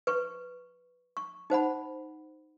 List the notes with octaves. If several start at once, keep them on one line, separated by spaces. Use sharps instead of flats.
B4 C#6
C#6
D#4 C5 F#5 B5